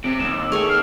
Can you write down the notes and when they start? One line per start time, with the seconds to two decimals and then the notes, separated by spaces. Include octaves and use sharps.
0.04 C3 D7
0.19 D#2 E7
0.37 D6 E6
0.52 G#4 A4 G5 C#6 F7
0.69 F6 C7